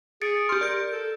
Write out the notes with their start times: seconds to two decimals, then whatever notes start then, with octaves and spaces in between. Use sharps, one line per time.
0.22 G#4 A6 C#7 D7
0.49 G4 C6 F6
0.61 A#4 D5 G6
0.92 A4